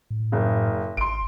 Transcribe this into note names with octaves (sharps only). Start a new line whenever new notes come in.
A2
F#1 C#3
G#1 C6 D7